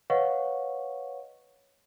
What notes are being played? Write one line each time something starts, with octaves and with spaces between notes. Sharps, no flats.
B4 C#5 D#5 F5 F#5 C#6